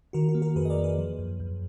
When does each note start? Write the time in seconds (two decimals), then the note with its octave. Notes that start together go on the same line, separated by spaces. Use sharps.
0.13 D#3 F#4 A#4
0.29 F#4
0.35 A#3
0.42 F#4 A#4
0.56 F2 G#4 B4
0.65 D#5
0.70 A#4 D5
0.78 A#3
0.84 G#4 B4
0.98 F3
1.19 F#2
1.40 F#2